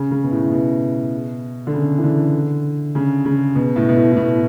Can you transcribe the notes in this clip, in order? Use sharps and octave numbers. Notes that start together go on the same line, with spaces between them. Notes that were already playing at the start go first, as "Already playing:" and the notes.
Already playing: C#3
C#3
B2
A2
A2
B2
D3
C#3
E3
D3
C#3
C#3
B2
A2
B2
A2
A2
B2